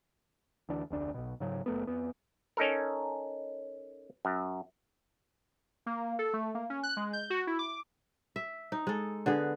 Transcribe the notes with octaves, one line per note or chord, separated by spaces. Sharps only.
D2 E3 D4
F1 D2 D4
B1 B2
G#2 C#3 F#3
F#1 A3 B3
F2 B3
C#4 D#4 A4 A#4
F#2
A#3
A4
A3
A#3
C#4
F#6
G#3
G6
F#4
E4
D6
E5
D#4
G#3 A4
D3 B3 G#4